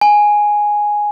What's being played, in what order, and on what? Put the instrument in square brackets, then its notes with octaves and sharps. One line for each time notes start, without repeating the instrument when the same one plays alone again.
[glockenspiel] G#5